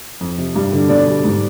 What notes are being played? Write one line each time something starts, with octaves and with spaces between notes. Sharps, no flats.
F2
C3
G2
D3
B2 D5
G3
G#2